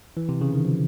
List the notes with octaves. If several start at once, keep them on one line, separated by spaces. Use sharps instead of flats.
E3
C3
C#3
D#3
F3